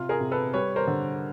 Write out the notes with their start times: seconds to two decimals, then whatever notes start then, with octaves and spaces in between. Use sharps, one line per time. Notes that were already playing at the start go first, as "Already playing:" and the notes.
Already playing: C3 F4
0.09 G#4 A#4
0.20 C3
0.32 A4 B4
0.53 G3 B4 C#5
0.76 A#4 C5
0.87 D3